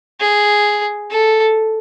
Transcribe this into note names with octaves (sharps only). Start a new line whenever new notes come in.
G#4
A4